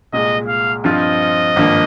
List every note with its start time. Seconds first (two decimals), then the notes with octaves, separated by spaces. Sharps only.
0.13 C2 A#2 G#3 D#5
0.48 F5
0.84 G2 F3 C4 F4 D#5
1.56 G#1 G2 F3 A#3